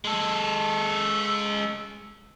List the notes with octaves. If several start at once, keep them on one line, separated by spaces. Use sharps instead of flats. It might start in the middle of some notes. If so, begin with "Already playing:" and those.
G#3 A4